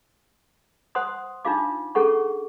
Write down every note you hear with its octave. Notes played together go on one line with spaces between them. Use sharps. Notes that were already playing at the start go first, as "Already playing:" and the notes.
C5 F#5 C6 D#6
D4 D#4 F4 F5 D6
C#4 G#4 A4 F#5 C#6